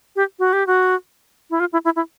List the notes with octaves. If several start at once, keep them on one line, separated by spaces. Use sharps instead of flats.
G4
F#4
G4
F#4
E4
F4
E4
E4
E4